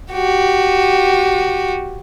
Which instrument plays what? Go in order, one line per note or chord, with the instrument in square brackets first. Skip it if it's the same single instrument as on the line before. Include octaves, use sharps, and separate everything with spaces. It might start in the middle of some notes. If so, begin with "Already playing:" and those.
[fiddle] F#4 G4